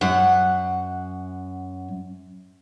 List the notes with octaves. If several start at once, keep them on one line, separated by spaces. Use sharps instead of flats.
F#2 F#5